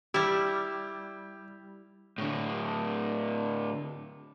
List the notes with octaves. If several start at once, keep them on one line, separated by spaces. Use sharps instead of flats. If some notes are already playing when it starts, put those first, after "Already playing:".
G3 E4 G4
A2 D3